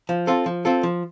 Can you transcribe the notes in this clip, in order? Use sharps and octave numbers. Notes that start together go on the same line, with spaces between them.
F3
C4 F4 A4
F3
C4 F4 A4
F3